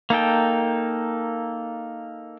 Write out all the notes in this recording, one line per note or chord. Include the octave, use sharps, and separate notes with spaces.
A#3 D#4 A4 G5